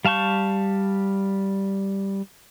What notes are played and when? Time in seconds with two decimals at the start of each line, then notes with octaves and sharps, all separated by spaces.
0.05 G3 F5 A5 C#6 G6